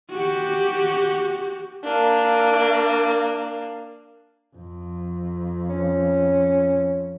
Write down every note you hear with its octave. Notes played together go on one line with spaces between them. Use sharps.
F#4 G4
A#3 D4
F2
C#4